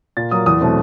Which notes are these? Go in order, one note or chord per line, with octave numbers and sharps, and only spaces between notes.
A#2 A6
F#3 A#3 D#6
E2 D#6
B2 F#3 A3 C4